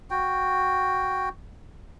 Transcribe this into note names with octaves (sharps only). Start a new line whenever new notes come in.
F#4 G5